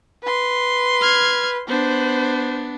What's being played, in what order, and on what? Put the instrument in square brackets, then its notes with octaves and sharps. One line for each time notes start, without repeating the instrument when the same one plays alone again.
[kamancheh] B4 C6
[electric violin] F6 G#6
[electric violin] B3 D4 [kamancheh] C5